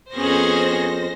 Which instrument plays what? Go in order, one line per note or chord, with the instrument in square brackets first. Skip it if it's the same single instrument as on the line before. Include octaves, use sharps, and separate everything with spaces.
[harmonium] F2 [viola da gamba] B3 C#4 G#4 [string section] C5 A#6